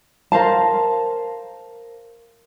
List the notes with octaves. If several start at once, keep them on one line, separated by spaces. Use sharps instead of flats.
A#4 C5 F5 A5